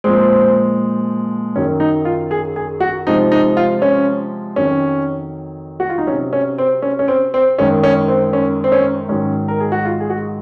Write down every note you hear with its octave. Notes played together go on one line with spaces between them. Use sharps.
A#2 F3 G#3 C4
F#2 D#3 F#3 C#4
D#4
F4
G#4
G#4
F#4
C3 F3 G#3 D#4
D#4
F4
C#4
F2 D#3 F#3 C#4
F#4
F4
D#4
C3 F#3 C#4
C#4
C4
C#4
C#4
C4
C4
F#2 D#3 G#3 C#4
C#4
C4
C#4
C4
C#4
G#2 D#3 F#3 C#4
A#4
G#4
F#4
F4
G#4
F#4